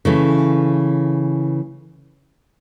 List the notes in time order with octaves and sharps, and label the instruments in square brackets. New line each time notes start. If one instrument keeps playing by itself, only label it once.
[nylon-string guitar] C#3 E3 A3